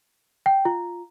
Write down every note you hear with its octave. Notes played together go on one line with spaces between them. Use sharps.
G5
F4